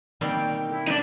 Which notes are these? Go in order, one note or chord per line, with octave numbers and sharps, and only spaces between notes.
B2 D#3 G3 A#3 C4 C#5 G5
E4 A4
D4 D#4